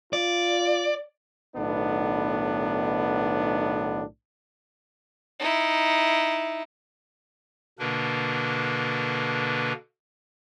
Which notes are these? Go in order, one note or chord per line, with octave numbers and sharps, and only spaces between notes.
F4 D5
B1 A2 D#3 B3 D4
D#4 E4
B2 D3 A#3 D4 A#4 B4